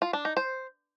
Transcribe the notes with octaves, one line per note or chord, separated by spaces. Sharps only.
F4
D4
D#4
C5